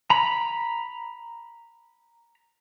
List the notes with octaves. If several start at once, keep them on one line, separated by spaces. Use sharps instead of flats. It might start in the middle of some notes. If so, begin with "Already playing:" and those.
A#5 B5